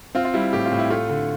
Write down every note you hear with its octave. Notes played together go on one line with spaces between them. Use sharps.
C4 F4
F4
G3 E4
A2 G4
F4
A2
E4
A3 F4
D3